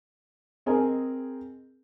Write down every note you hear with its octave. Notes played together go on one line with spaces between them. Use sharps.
C4 G#4 A#4 D#5 G#5